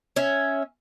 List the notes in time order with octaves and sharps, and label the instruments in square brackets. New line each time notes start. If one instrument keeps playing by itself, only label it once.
[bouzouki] C#4 E5